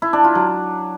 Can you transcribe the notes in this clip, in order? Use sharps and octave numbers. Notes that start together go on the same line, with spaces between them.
E4
D4
F4
F#3